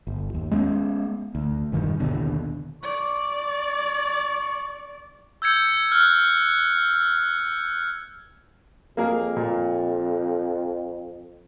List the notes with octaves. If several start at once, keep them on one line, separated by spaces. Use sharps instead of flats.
G1
D#2
G#3 B3 C#4
D2
E1 G2 D#3
A#1 D#2 B2 D3
D5 C#6
E6 G6 G#6 C#7
F6 F#6
F2 A#3 G#4 A#4
A#2